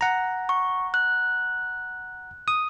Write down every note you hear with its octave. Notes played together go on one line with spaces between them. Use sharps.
F#5 A#5
C#6
F#6
D#6